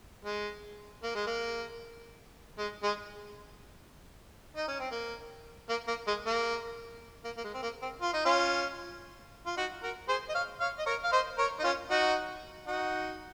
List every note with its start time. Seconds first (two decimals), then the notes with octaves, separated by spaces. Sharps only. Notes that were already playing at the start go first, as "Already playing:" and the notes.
0.25 G#3
1.03 A#3
1.15 G#3
1.27 A#3
2.58 G#3
2.83 G#3
4.56 D#4
4.68 C#4
4.80 C4
4.91 A#3
5.69 A#3
5.88 A#3
6.07 G#3
6.26 A#3
7.24 A#3
7.37 A#3
7.44 G#3
7.54 C4
7.62 A#3
7.82 C4
8.02 F4
8.13 D#4
8.25 C#4 F4
9.46 F4
9.57 D#4 F#4
9.83 F#4 A#4
10.08 G#4 C5
10.29 D#5
10.34 C#5 F5
10.60 C#5 F5
10.78 D#5
10.86 A#4 C#5
11.04 F5
11.12 C5 D#5
11.38 A#4 C#5
11.59 D#4
11.63 C#4 F4
11.90 D#4 F#4
12.67 D#4 F#4